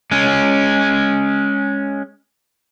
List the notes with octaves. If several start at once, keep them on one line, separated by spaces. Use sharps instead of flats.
G#3 C#4